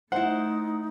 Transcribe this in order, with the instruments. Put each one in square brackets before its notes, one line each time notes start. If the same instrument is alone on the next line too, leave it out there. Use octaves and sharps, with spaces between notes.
[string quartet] A3 [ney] D#4 [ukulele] E4 C5 [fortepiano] F#5